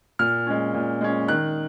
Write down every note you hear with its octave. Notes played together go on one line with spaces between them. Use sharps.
A#2 F6
G#3 C#4
A#2
G#3 C#4
D#3 F#6